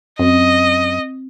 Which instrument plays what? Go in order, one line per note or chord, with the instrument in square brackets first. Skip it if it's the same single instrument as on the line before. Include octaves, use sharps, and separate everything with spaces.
[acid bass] F#2 [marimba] C4 [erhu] D#5